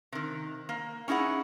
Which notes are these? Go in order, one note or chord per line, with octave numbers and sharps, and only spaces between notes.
C3 D#3
A#3
C#4 D#4 E4 G#4 F#5